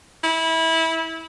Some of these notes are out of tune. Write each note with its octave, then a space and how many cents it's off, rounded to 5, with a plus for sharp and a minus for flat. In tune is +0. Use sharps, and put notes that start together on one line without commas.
E4 -20